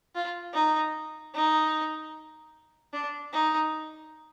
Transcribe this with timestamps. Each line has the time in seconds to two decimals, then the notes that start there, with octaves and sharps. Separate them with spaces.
0.15 F4
0.54 D#4
1.34 D#4
2.93 D4
3.33 D#4